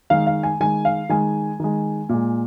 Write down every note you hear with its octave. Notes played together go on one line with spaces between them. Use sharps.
D#3 G#3 F5
F5
G#5
D#3 G#3 G#5
F5
D#3 G#3 G#5
D#3 G#3
A#2 G#3